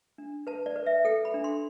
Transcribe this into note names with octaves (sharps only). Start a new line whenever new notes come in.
D4
B4 A5
D5
B4
E5
A4 G5
B5
D4
C6